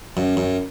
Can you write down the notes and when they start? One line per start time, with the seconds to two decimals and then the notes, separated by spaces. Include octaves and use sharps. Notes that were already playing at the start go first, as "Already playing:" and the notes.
0.17 F#2
0.37 F#2